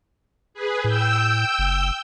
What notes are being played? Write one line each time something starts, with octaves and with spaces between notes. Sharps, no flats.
G#4 B4
A2 G5 E6 G6
F#1